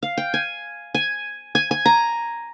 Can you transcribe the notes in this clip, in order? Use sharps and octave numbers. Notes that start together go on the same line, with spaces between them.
F5
G5
G#5
G#5
G#5
G#5
A#5